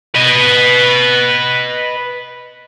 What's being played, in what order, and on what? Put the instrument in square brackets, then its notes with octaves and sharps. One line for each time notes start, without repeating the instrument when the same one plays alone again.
[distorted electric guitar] B4 D#5